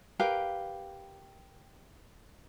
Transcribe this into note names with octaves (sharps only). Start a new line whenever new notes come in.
G4 A#4 B4 F5